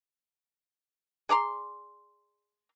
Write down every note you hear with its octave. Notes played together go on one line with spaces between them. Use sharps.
G#4 D5 A#5 C6